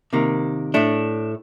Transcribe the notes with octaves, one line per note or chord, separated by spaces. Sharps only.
C3 D#3 A#3
A2 A3 D4